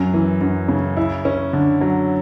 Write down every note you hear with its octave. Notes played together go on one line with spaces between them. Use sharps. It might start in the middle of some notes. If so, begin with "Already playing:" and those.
Already playing: F#2
E3
F#2
C#3
E4
C#4
D3
F#3